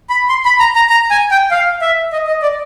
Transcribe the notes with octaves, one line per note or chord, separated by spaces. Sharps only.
B5
C6
B5
A#5
A#5
A#5
G#5
G5
F5
E5
D#5
D#5
D5